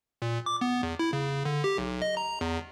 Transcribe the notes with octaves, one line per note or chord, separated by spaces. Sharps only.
A#2
D6
B3
E2
E4
C#3
D3
G4
B1
D#5
A#5
E2